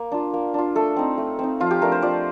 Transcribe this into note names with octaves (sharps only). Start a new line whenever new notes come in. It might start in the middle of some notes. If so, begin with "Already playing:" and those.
Already playing: A#3
D4 F4
A#3
D4 F4
A3 A4
C4 D#4
A3
C4 D#4
F3 F4
G4
A3 D4 A#4
C5
F3 D5